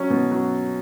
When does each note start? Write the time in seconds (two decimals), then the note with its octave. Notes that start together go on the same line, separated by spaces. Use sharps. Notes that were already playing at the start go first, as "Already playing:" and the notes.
Already playing: F#3 C#4
0.10 B2
0.32 F#3